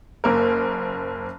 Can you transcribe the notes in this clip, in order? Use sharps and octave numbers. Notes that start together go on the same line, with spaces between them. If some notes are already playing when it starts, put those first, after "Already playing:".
F#1 A#3 A#4